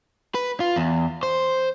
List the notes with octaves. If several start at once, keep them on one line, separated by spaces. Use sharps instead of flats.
B4
F4
E2
C5